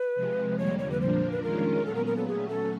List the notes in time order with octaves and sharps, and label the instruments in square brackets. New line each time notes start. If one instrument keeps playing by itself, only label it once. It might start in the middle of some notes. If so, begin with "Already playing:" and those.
Already playing: [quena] B4
[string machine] C3 F3 G#3
[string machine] F2 D3 G3 A#3 [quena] C#5
[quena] C#5
B4
[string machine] A#2 F3 A#3 D4 [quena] C5
[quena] B4
[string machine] D#3 G#3 C#4 F4 [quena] A#4
[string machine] A#2 F#3 B3 [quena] A4
[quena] A#4
A#4
A4
[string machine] F#3 A3 C#4 [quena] G#4
[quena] A4